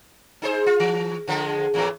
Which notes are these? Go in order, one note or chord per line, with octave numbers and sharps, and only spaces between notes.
D#4 G#4 C5
F4
E3
D3 F3 G#3
E2 A2 E3